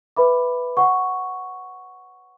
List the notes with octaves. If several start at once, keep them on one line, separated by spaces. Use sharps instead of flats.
B4 E5 B5 D6
C#5 F#5 C#6